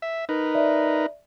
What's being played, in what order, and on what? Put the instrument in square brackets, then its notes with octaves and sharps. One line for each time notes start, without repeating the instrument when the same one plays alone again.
[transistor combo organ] E5
D#4 A#4 B4
[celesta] D5 E5